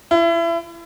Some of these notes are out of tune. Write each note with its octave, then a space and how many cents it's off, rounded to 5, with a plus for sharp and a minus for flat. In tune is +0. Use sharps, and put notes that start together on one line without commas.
E4 +30